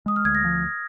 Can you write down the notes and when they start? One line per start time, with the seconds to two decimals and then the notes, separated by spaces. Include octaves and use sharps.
0.06 G#3 D#6
0.16 F6
0.25 D2 G#6
0.35 A#6
0.44 F3